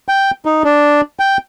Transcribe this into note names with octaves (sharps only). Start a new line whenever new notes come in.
G5
D#4
D4
G5